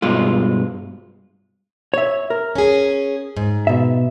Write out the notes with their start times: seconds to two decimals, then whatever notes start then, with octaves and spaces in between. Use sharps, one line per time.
0.02 G2 B2 G#3 F4
1.94 C#5 E5
2.30 A#4
2.55 C#4 G#4
3.37 G#2
3.67 B2 E5